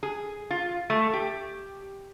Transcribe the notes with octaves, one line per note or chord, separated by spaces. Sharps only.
G#4
F4
A3
G4